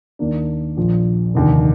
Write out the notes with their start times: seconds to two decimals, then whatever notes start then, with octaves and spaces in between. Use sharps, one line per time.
0.19 D#2 D#3 A#3 D4
0.77 A#1 A#2 F3
1.34 F1 D#2 D3